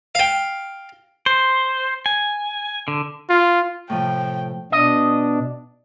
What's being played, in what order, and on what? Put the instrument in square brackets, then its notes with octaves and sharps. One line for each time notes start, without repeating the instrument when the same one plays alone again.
[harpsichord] F5 G5
[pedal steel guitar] C5
G#5
D3
[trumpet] F4
[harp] A2 C3 F3 [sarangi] G5
[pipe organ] B2 D4 [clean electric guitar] D#5